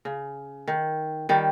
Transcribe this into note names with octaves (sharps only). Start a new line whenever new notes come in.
C#3
D#3
D#3 G3